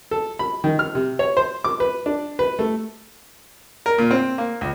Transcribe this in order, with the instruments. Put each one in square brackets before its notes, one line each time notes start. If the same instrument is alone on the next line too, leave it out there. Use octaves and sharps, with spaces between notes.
[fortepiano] A4
B5
D#3
F6
C3
C#5
C5
D6
B4
D4
B4
A3
A#4
A#2
C4
A#3
C#2